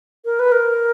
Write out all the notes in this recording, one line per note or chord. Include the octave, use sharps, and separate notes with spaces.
A#4
B4
A#4